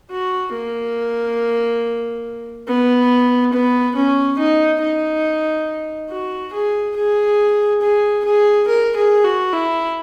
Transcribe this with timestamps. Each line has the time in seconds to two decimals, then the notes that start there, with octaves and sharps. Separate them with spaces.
0.10 F#4
0.53 A#3
2.68 B3
3.53 B3
3.95 C#4
4.39 D#4
4.82 D#4
6.10 F#4
6.53 G#4
6.96 G#4
7.81 G#4
8.24 G#4
8.68 A#4
8.96 G#4
9.24 F#4
9.53 E4